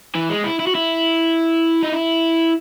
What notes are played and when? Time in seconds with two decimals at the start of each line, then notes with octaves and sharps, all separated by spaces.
0.15 E3
0.30 G#3
0.44 E4
0.59 E4
0.67 F#4
0.75 E4
1.83 D#4
1.93 E4